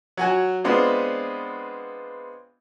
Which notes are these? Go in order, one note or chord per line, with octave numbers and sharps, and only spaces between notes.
F#3 F#4 G#5
G#3 B3 C4 D4 F4